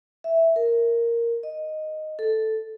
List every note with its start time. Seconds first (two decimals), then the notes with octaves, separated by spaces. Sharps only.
0.24 E5
0.56 A#4
1.43 D#5
2.19 A4